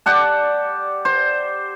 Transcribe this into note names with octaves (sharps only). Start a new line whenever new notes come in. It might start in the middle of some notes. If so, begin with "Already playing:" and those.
G4 D5 F#5 A5
C5